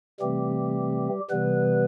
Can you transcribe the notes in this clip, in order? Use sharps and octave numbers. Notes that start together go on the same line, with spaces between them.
C3 E3 G3 A3 C4 G4
C3 E3 G3 B3 B4